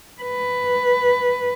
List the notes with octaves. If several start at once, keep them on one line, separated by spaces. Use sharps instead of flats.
B4